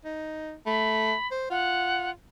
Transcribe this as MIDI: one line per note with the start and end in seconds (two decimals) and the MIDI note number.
0.05 0.55 63
0.66 1.14 57
0.66 1.27 83
1.31 1.47 72
1.50 2.12 65
1.50 2.10 78